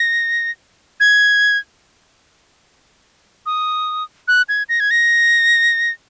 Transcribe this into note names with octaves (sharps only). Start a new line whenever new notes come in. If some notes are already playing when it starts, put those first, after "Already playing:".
Already playing: A#6
G#6
D#6
F#6
G#6
A#6
G#6
A#6